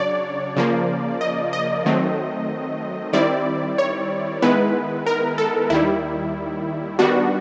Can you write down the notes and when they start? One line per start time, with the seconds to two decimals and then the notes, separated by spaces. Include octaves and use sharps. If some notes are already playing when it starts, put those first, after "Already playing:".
Already playing: C#3 F#3 D4 C#5 D5
0.56 C#3 F3 A#3
1.21 D#5
1.53 D#5
1.86 D#3 F#3 A3 C4
3.13 D#3 G3 C4 E4 D5
3.78 C#5
4.42 D#3 G#3 B3 E4 B4
5.06 A#4
5.38 A4
5.70 D#2 D#3 G3 E4
6.99 D#3 G3 B3 D4 F#4